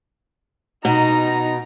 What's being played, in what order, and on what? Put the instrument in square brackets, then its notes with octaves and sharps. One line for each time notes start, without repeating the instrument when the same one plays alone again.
[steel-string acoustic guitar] B2 [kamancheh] D#4 A#5